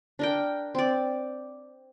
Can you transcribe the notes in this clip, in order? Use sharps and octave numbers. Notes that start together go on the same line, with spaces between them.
D4 A#4 G5
C4 D5